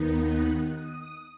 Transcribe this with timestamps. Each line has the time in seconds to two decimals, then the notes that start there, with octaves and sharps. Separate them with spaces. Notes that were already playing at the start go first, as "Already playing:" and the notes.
Already playing: D#2 D#3 B3 D#4
0.25 F#6
0.71 D#6